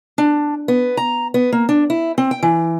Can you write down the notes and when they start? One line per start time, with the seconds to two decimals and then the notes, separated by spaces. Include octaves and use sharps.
0.18 D4
0.68 B3
0.97 A#5
1.34 B3
1.52 A#3
1.69 D4
1.90 E4
2.18 C4
2.31 G5
2.43 E3